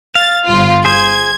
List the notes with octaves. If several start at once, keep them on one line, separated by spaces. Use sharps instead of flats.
F5 A6
G1 F4
G#4 C5 G#6